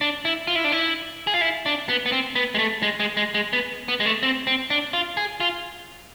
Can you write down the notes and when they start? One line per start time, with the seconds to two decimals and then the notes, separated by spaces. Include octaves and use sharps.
0.01 D4
0.25 E4
0.47 F4
0.55 E4
0.65 D4
0.72 E4
1.27 G#4
1.34 F4
1.41 E4
1.66 D4
1.89 B3
2.06 B3
2.12 C4
2.35 B3
2.54 G#3
2.59 A3
2.83 G#3
3.00 G#3
3.17 G#3
3.34 G#3
3.53 B3
3.88 B3
4.00 G#3
4.06 A3
4.23 C4
4.47 C4
4.70 D4
4.93 F4
5.17 G#4
5.40 F4